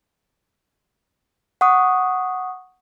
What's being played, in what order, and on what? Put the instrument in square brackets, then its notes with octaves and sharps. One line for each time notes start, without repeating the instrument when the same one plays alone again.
[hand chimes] F#5 C#6 D#6